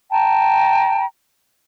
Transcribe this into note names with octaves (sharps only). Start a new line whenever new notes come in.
G5 A5 A#5